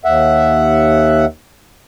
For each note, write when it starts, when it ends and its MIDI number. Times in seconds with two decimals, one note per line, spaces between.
0.05 1.25 39
0.05 1.25 76
0.05 1.25 78